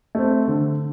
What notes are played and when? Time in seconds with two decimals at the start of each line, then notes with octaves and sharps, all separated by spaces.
0.15 A3 C4
0.48 D3